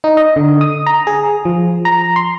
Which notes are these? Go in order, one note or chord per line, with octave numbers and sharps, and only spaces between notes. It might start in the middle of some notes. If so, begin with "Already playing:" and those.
D#4
D#5
D3
D#6
A#5
G#4
F3
A#5
C6